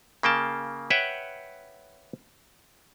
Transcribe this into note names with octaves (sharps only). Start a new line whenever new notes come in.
C#3 A#3 G5 A5
B4 C#5 E5 F#5 G5